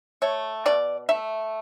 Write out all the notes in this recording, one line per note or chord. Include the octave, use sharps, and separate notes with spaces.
A3 C#5
B2 D5
A3 E5